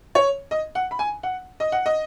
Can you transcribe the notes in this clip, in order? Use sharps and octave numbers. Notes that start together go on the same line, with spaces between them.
C#5
D#5
F#5
B5
G#5
F#5
D#5
F#5
D#5